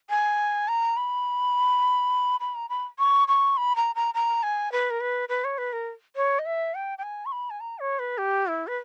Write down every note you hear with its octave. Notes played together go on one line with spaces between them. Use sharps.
G#5
A#5
B5
B5
A#5
B5
C#6
C#6
B5
A#5
A#5
A#5
G#5
B4
A#4
B4
B4
C#5
B4
A#4
C#5
D#5
E5
G5
G5
G#5
C#6
B5
G#5
A#5
C#5
B4
G4
E4
B4